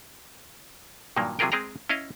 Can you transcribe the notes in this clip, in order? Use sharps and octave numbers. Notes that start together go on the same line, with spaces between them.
G2 A#2 D#3 F#3 A#3
C3 F#3 F4 G#4 A#4 G5
G#3 C4 G#4 G5 A#5
C#4 E4 D#5 F5